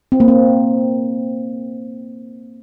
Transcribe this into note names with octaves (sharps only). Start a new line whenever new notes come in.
C4
A#3
C4